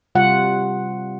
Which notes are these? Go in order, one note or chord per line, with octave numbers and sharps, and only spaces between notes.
C3 G3 F4 F#5